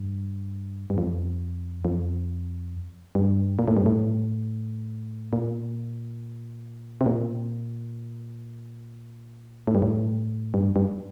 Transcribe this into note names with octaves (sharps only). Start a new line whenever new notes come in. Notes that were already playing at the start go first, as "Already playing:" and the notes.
Already playing: G2
G2
F2
F2
G2
A#2
A2
G2
A2
A#2
C3
A#2
A2
G2
A2
G2
G2